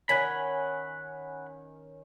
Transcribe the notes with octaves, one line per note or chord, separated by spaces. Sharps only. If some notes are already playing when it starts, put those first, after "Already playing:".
D#3 C#4 F#5 G#5 B5